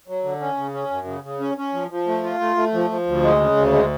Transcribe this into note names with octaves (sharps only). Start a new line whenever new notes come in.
F#3
D3
C#4
C#3
C#4
F#2
C#3
C#3
C#4
C#4
F3
F3
A3
F4
A3
A3
F3
F3
D2
G#3
C#3
D2
G#3